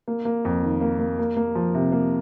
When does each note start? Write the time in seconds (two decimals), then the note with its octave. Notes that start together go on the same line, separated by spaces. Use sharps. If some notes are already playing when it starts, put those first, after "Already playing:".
0.08 A#3
0.25 A#3
0.45 F2
0.63 D#3
0.81 A#3
0.99 A#3
1.19 A#3
1.37 A#3
1.55 F3
1.74 C3
1.92 A#3